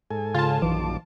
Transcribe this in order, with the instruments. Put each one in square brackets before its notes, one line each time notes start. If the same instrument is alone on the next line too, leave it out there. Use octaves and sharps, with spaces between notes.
[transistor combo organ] G#2 A4 G#5
[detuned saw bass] C#3 [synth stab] F4 A5
[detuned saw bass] A#1 [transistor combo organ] F#2 D#3 D6 [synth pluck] E3